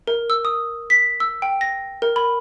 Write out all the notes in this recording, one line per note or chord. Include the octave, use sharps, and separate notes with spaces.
A#4
E6
D#6
B6
E6
G5
A#6
A#4
B5